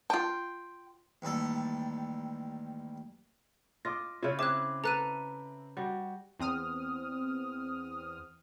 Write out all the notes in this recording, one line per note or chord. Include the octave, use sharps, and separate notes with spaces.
F4 G5 A5 C6
A1 D#2 G3 A4
F4 D#5 D6 A#6
C#3 E4 F4 C#5
C4 E4 G#4 E5 D6 F#6 E7
A4 B4 A#5 F#6 D#7
G3 F#4
E2 C4 D#6 F6